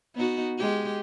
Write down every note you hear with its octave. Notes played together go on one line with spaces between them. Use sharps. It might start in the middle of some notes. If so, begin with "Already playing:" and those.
B3 D#4 F#4
G#3 G4